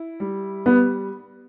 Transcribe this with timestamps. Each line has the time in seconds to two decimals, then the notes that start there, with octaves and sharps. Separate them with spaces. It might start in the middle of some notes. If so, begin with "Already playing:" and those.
Already playing: E4
0.20 G3
0.66 G3 B3